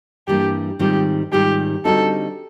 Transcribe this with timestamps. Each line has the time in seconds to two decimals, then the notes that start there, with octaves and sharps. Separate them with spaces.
0.27 G2 E3 G3 A#3 G4
0.79 G#2 D#3 G3 C4 F4 G4
1.32 G#2 D#3 G3 C4 F4 G4
1.85 D3 G3 C4 D#4 F#4 A4